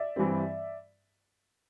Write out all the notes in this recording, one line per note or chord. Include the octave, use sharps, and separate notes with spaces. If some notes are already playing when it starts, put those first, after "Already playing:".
Already playing: D5 E5
G2 E3 G3 C4